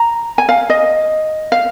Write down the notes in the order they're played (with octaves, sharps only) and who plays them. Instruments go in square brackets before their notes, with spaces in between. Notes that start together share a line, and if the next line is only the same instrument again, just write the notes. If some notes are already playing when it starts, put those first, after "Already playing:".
Already playing: [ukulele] A#5
G#5
F5
D#5
F5